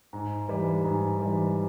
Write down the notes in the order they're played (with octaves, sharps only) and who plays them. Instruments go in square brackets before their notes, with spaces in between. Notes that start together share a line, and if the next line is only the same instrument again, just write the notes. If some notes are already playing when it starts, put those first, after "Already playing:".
[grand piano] G#2
E3 G3
G#2
E3 G3